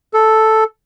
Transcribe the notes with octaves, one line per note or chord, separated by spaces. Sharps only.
A4